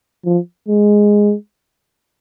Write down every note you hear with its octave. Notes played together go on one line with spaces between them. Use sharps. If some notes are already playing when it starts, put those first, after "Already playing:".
F3
G#3